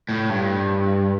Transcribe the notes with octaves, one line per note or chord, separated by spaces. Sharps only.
A2
G2